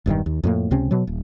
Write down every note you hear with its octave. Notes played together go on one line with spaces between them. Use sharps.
E1 G2 C3 D#3
D#2
F2 A2 A#3
C#2 C3 C4 C#4
B2 F#3
D#1